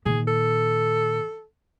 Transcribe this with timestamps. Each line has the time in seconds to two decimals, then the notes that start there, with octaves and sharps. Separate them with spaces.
0.06 A#2 D#3 G#4
0.27 A4